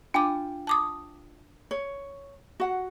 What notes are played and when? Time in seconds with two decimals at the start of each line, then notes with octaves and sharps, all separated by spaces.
0.14 D4 F4 G5 G#5 D6
0.67 A5 D6 D#6
1.71 C#5
2.60 F#4 F#5